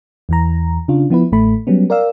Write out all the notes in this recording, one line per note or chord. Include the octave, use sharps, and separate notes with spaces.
E2 E3 A#5
C#3 D4 F4
F3 B3 E4 B4
A1 A2 A3 B5
F#3 G3 B3 C#4
A#4 D5 F5 E6